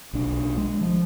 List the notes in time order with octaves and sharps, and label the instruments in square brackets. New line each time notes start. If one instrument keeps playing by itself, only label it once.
[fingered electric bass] B1 D4
G#3
F3